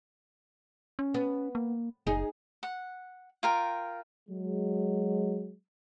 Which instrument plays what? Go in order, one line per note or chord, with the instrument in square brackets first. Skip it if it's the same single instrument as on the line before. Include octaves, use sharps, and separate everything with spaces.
[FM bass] C#4
[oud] B3
[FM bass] A#3
[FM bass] F#1 [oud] D#4 G#4
[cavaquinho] F#5
F4 A#4 G5
[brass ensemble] F#3 G#3